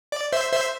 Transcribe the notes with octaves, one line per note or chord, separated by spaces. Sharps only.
D5
C5 E5
C5 E5